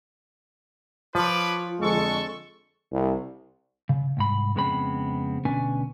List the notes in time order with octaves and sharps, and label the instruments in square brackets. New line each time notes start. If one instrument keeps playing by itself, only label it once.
[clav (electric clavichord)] F3 [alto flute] F4 [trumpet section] B4 C#5 D6
[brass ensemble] F2 D3 G#3 [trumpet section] A4 C#6
[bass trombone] C2
[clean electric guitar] C#3
C2 G#2 B5
F2 C#3 G#3 B3 C4 B5
D2 B2 C#4 D4 B4 G#5